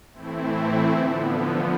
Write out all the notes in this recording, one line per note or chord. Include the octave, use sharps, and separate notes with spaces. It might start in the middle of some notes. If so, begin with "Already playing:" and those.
A2 E3 A3 C4 E4
D3 F3 B3